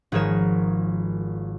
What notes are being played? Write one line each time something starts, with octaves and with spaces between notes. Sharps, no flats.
G#1 F3 G#4 A#4 C#5 E7